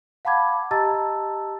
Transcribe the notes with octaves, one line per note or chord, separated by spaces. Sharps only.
F5 F#5 A5 B5 D6 G#6
G4 D#5 A5 A#5 E6 A6